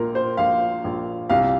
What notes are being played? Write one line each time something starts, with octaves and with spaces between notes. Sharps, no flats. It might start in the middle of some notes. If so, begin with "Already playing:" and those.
Already playing: A#1 A#2 A#4
C5
A#1 F5
A#1
C2 F5